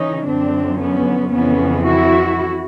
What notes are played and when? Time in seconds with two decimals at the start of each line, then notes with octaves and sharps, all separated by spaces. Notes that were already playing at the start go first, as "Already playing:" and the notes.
Already playing: C#3 E3 C#4 D#4
0.26 F#2 D3 F3 C4 D4
0.80 B3 C#4
1.33 F2 C#3 E3 B3 C#4
1.86 E4 F#4